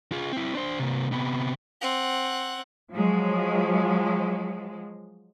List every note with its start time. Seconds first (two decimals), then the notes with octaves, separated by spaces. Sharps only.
0.12 F4 G#4
0.33 C4 E4
0.55 D4 C5
0.79 C3 A#3
1.12 C3 B3
1.81 C4 F#5
2.92 F3 F#3 G#3